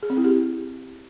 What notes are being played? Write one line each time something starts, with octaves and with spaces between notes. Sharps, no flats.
G#4
C4
E4
G4